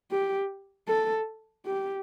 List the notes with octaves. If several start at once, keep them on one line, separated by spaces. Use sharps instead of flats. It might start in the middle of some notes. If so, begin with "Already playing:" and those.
G4
A4
G4